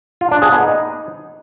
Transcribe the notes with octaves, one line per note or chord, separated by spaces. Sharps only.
F4
D4
G#4
B3
D#4